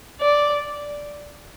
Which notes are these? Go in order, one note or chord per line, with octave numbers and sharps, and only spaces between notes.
D5